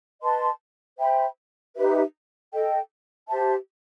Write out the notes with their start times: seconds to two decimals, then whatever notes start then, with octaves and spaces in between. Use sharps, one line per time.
0.22 B4 D#5 A5 C6
0.98 C5 E5 G5 B5
1.75 D#4 G4 B4 E5
2.52 A4 D#5 G5
3.27 G4 C5 E5 A5